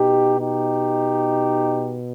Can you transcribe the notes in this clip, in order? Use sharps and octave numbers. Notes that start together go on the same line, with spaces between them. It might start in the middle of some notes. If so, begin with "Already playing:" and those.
Already playing: B2 D#4 G4
D#4 G4